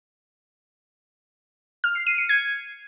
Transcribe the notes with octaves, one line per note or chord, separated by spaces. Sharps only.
F6
C7
D#7
C#7
G#6